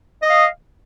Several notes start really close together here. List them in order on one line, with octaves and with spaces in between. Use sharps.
D#5 D#6 F5